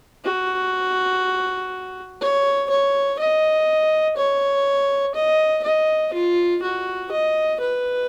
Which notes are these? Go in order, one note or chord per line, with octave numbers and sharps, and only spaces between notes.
F#4
C#5
C#5
D#5
C#5
D#5
D#5
F4
F#4
D#5
B4